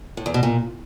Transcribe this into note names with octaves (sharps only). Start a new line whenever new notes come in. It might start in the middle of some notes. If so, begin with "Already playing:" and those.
A2
E2
B2
A#2